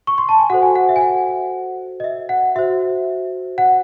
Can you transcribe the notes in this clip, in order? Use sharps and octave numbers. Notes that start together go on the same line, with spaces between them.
C#6
C6
A5
G#5
F#4 A4 C5 F#5
G#5
F#5
E5
G#5
F#5
D#5
E5
F#5
F#4 C5 E5
F#5